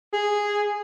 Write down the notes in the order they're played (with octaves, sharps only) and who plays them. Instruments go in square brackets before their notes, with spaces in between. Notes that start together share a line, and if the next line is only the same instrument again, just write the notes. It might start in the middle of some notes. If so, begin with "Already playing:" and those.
[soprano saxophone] G#4